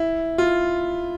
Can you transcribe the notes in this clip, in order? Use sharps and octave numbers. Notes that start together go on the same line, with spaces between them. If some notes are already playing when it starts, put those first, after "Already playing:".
Already playing: E4
F4